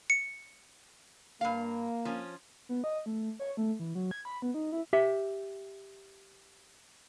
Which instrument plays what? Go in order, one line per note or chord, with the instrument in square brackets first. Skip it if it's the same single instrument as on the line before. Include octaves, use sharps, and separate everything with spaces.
[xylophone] C#7
[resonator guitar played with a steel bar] G2 F5 [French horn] A#3
[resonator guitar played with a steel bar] F3 C#4
[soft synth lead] B3
D#5
A3
C#5
A3
E3
F#3
G#6
B5
B3
D#4
E4
[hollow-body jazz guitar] G4 E5